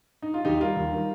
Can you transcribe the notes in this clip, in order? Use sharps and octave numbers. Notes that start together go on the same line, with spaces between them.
D#4
F4
D#2 D#4 G4
D#3 G3 F4 A#4
D#2
D#3 G3